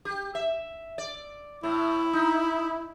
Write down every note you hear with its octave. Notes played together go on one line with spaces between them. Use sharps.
G4
E5
D5
A2 E4
D#4